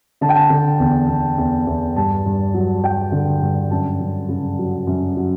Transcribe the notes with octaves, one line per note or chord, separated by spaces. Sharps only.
D3 A5
G5
A5
D3
E2
E2
E2
E2
G2 A5
G2
F#3
F#3 G5
D3
G2
F#2 A5
F#2
C#3
F#3
F#2
F#3